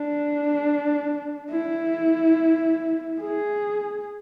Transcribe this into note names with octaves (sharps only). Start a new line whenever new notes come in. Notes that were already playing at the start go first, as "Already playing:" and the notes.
Already playing: D4
E4
G#4